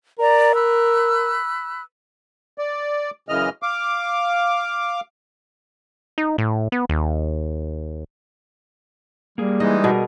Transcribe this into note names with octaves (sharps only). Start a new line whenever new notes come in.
A#4 D5 A#5
B5 E6 F#6
D5
F#2 C#3 E3 D#5 F6
F5 D6
D#4
A2
B3
D#2
G3 A#3 G#4
E3 G#3 D#4 D#5
B2 G#4 A#4